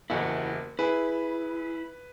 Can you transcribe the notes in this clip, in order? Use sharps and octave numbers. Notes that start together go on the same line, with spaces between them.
F#1 E2 E4 F#4 G4 D#5
E4 G#4 B4